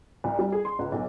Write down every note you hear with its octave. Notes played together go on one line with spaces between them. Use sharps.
C2
G3
G#4
C6
C#2
B1